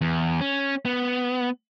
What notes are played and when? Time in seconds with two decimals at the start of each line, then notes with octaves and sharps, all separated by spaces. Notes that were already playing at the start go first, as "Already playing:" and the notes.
0.01 E2
0.41 C#4
0.85 B3